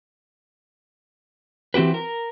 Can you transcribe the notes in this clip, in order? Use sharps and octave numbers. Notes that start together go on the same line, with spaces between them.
E3 C4 F#4 G4 B4
A#4